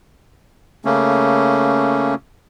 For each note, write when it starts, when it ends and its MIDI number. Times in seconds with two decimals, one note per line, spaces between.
0.85 2.15 49
0.85 2.15 57
0.85 2.15 58
0.85 2.15 61